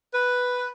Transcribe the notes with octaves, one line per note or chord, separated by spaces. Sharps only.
B4